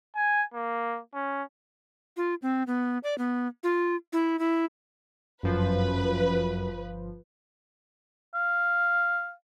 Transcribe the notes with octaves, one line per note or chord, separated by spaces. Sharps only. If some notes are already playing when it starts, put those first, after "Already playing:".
G#5
A#3
C#4
F4
C4
B3
D5
B3
F4
E4
E4
G1 F#2 F3 B4
F5